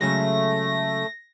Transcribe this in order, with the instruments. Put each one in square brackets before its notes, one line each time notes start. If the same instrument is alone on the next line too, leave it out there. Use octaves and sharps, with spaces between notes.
[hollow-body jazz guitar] C#3 F#3 G#3 [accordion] A3 [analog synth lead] A#6